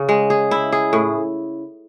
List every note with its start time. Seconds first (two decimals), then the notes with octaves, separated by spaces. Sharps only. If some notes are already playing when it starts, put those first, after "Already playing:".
Already playing: C#3
0.09 G#3
0.30 G#4
0.51 E4
0.72 G#4
0.93 A2